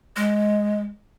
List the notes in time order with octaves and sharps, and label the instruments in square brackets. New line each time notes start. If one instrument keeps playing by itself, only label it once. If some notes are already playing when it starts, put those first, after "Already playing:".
[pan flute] G#3